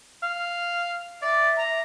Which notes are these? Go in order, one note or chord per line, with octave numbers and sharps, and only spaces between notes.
F5
D5 E5
A#5